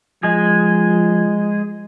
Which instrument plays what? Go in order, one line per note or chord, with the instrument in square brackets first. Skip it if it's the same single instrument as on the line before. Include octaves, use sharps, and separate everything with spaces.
[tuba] F3 [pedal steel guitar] G#3 G#4